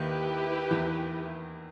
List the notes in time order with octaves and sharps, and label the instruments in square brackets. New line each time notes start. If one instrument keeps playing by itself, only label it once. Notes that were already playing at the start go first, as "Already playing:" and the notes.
Already playing: [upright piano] D#2 D#3 [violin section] E4 G4 B4
[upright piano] E2 E3